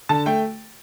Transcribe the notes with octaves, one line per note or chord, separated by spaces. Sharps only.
D3 A5
A3 G5